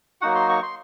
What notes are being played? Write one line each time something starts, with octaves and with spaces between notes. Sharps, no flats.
F#3 A#3 D#4 F#4 F#5
C6
C#6
C6